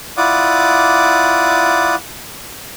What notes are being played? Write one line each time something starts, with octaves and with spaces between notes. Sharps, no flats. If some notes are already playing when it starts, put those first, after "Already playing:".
E4 F4 D5 F#5 D6 D#6